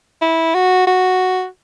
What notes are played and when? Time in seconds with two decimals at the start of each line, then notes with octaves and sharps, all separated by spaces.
0.22 E4
0.54 F#4
0.87 F#4